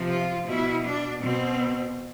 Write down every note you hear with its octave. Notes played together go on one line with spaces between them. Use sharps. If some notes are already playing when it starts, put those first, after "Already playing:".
Already playing: C3 F3
F4
B2 E4
D4
B2 C4